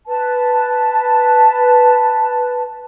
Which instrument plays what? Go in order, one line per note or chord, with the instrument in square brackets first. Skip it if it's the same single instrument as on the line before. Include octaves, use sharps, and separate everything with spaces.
[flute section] B4 A5